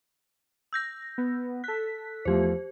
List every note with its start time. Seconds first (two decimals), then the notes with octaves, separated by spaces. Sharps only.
0.73 E6 G6 A#6
1.18 B3
1.64 A4 F#6 B6
2.25 E2 F3 A3 G4 C5